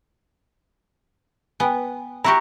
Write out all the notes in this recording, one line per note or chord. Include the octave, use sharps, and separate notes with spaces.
B3 G5 G#5
E4 F#4 G4 A#5 C#6